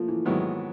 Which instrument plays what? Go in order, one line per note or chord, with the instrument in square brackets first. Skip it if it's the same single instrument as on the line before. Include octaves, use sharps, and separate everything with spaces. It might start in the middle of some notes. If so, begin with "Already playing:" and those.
Already playing: [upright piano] F3 A3 A#3
E3
[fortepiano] G#2 D#3 F#3 B3 E4